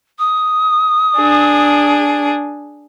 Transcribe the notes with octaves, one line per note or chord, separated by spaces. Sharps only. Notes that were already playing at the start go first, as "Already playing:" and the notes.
D#6
D4 G#4